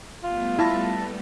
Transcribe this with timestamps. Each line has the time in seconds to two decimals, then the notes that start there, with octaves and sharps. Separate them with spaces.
0.23 G3 A3 B3 F4
0.59 E4 E5 A5 A#6